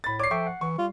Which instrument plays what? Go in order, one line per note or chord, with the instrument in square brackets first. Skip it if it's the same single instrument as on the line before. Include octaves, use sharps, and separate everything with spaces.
[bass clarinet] A2 [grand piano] B5 A6
[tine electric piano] C#5 D5 [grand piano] D6 C7
[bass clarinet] F3 [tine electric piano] A4 E5 G5 [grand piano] C#6
[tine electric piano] F#5
[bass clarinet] E3 [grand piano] C#6
[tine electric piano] G3 [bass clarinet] F4